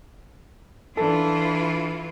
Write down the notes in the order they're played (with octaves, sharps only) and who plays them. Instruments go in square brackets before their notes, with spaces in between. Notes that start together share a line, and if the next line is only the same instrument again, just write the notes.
[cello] E3 F4 [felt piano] D4 A4